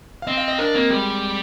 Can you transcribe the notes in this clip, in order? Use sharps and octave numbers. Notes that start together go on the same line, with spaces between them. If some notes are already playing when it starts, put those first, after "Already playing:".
F5
C4 D#5
F5
D#5
D4 A#4
A#3 C4
G3 G#3